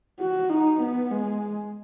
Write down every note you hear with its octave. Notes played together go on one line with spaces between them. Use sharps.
F#4
D#4
B3
G#3